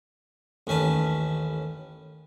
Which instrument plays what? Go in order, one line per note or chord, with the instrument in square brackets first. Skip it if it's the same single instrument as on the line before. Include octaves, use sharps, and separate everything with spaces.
[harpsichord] A1 D#2 C#4 B4 A5